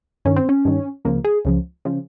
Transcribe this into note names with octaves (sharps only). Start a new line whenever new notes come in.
G2 D#3 C#4
C4
C#4
G2 D#3
C#2 C#3 F3 A#3
G#4
C#2 C#3 F3
C#3 F3